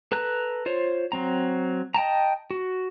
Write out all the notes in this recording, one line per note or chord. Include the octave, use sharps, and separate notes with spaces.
A4 B4 A#5 F#6
F4 C5 C#5
F#3 C4 A#5
D#5 G5 A5 A#5
F#4